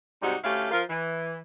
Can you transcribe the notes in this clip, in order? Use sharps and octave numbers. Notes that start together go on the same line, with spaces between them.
G#2 C3 G3 D#4 F#4 G4
D2 A3 C#4 E4 G4 F5
F3 F4 A#4
E3